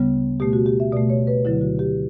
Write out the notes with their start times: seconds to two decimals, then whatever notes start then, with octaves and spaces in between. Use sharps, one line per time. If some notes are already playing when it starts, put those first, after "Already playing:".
Already playing: D2 C#3 G3 B3
0.40 B2 A3 G4
0.53 F#4
0.66 G4
0.80 E5
0.93 B2 A3 D5
1.10 C#5
1.27 B4
1.45 D2 D3 F#3 E4
1.61 F#4
1.79 G4